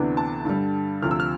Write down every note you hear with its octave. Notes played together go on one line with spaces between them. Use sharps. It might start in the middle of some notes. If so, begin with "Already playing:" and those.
Already playing: D2 C3 E3 B3 D4
A5
G2 D3 G3
D2 C3 F3 F6
E6
F6